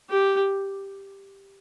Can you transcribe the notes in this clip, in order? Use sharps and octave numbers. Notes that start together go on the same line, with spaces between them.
G4